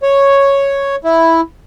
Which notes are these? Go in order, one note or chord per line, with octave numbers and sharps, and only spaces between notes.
C#5
E4